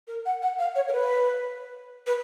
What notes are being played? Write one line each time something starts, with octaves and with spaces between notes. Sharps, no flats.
A#4
F#5
F#5
F5
C#5
A#4
B4
B4